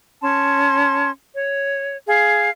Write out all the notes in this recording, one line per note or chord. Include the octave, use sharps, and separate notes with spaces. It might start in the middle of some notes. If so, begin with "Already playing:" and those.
C#4 A5 C6
C#5
G#4 F5